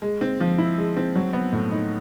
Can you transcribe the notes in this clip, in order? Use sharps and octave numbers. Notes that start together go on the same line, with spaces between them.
G#3
C4
F3
E4
G#3
C4
F#3
B3
A2
D#4